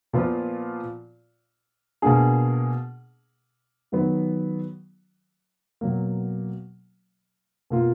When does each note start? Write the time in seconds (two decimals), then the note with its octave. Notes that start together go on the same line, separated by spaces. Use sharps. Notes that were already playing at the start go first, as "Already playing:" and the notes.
0.13 A#2 F3 B3 F4
2.02 B2 A#3 D4 G#4
3.92 D#3 F#3 B3
5.81 B2 F#3 A#3
7.70 B2 A#3 F4